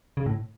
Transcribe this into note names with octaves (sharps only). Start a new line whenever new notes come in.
C#3
A2